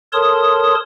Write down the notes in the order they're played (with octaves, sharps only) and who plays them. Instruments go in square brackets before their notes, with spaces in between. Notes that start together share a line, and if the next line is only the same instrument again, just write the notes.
[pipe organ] A4 A#4 C#5 A5 C6 D#6